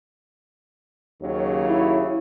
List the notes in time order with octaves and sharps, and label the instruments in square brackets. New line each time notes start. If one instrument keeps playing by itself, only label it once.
[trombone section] D#2 C#3 F#3
[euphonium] E4